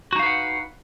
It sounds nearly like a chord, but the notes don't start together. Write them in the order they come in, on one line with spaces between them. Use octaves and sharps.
F#4 D#4 F5 B4 F#5